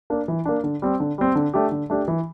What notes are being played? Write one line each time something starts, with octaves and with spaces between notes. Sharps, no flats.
A#3 D4
E3
A#3 D4
D3
G3 C4
D3
G3 C4
D3
A3 D4 G4
D3
A3 D4 G4
E3